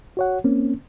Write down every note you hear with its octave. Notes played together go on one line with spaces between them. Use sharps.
F#4 C#5 F#5
A#3 C4 C#4